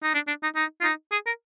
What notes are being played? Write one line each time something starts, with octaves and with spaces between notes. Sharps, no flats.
D#4
D4
D4
D#4
D#4
F4
D#4
G#4
A#4